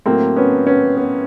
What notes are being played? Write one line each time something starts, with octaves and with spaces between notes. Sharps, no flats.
A2 F#3 A3 A#3 C4
B3 C#4
B3 C#4
B3